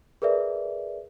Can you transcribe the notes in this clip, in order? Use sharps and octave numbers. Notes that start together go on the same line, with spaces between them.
G#4 A#4 B4 D5 E5